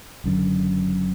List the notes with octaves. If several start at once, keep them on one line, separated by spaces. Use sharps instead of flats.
F#1 F#2 D3